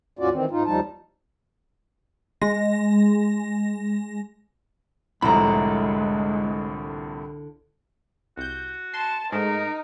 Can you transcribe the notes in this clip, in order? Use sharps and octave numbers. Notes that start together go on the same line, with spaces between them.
D#2 G#2 C#4 F4 F#4 D5
D#3 E3 C4
G#2 D#4 F4
D#2 F3 G3 D#4 A5
G#3 A#6
C2 F2 A2 D3 G#3 E4 A#5 B5
C2 F#4 G6
A5 C6
G#2 G#3 A3 D#4 A#4